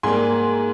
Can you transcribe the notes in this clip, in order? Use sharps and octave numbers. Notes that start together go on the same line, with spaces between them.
G#2 G3 A#3 G#5 C6